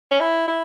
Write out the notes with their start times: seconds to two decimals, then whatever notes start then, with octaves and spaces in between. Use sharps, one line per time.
0.11 C#4
0.21 E4
0.48 E4